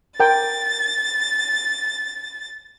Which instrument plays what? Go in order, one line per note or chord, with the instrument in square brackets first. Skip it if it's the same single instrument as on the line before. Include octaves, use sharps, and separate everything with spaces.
[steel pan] A#4 G5 [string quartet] A6